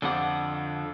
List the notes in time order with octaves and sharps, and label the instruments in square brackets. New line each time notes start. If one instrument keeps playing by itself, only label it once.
[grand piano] F2 F3 D6 [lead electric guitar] D3 F#5